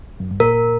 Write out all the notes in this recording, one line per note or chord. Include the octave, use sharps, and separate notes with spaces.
F#2
G2
A#2 A#4